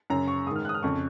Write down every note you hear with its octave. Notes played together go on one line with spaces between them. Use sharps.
F#2 C#3 A#5
C#6
G#2 D#3 D#6 F6
F#6
D#6
F6
F2 C#3 C#6